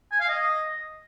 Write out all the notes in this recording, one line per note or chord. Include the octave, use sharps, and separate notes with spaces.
G#5
F5
D#5